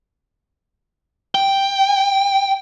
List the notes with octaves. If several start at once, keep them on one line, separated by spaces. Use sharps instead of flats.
G5